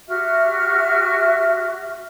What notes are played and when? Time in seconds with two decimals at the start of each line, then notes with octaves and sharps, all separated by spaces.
0.08 F#4 G4 E5 F6